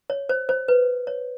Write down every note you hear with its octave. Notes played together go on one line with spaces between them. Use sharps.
C#5
C5
C5
B4
C#5